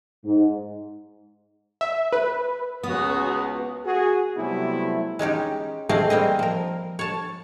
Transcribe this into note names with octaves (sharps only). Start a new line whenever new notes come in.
G#2
E5
B4
C#2 B3 C#4 F#4 D#6
F#4 G#4
C3 F#3 G3 A3 B3 E4
G#3 C#4 D#4 G4
A3 C4 G#4 D#5 F5
G3 A#3 C4 D#5
F3 A#4
C#5 A5